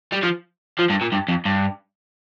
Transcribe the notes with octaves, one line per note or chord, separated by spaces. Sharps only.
G3
F3
F3
G2
A#2
G2
F2
G2